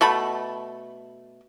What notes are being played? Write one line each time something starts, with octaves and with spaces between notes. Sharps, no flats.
B2 A3 B5